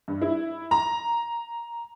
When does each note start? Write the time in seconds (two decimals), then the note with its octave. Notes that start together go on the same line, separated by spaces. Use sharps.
0.08 G2
0.22 E4
0.71 A#5